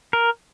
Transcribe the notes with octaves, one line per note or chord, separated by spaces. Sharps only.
A#4